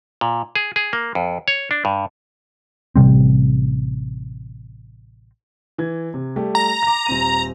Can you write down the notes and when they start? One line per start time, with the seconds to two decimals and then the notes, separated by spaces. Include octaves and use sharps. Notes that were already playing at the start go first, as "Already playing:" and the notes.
0.21 A#2
0.55 G#4
0.76 G#4
0.93 A#3
1.15 F2
1.48 C#5
1.71 D4
1.85 G2
2.96 A1 C3 G3 C4
5.78 E3 G#6
6.14 C3
6.36 G3 A3 G4
6.55 A#5
6.83 D6 A#6
7.06 D#1 C4 D#7